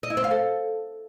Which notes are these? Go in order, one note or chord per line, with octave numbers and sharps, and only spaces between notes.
D#5
E4
C4
F5
A4